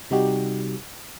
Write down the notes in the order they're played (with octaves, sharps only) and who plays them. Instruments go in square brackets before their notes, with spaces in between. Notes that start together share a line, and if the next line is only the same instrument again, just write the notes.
[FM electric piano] C3 G3 D#4 F#4 G4